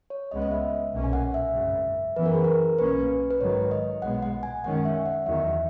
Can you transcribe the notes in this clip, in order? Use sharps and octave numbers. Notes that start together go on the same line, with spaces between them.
C#5
C#2 C#3 G#3 B3 D#5
D#5
E5
B1 A#2 A#3 C#4
G#5
F#5
E5
G#1 F#2 C#3
F#2 E3 B3 B4
A#4
G#4
A#4
B1 A#2 A#3 C#4 B4
B4
G#2 D#3 F#3 C#5
D#5
B1 A#2 G#3 B3 F#5
F#5
G#5
F#2 D#3 G#3 C#4 F#5
E5
F#5
E2 D#3 F#3 E5